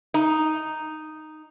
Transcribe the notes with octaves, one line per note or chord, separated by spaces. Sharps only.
D#4